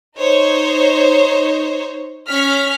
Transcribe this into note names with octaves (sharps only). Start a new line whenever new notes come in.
D#4 C5 C#5
C#4 F6 B6